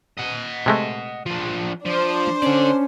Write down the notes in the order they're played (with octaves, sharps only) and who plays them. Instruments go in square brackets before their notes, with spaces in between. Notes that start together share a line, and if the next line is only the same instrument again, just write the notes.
[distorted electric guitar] D#5 F#5
[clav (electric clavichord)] C3 G#3 A3
[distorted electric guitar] F3 D4
[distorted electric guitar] F3 [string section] D4 C5
[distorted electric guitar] D3 D5 [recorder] C#4